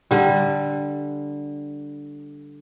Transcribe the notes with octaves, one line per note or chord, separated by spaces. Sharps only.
D3 G3